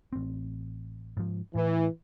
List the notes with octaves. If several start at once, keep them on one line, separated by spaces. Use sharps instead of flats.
A1 C4
G#2 F3
A2 E3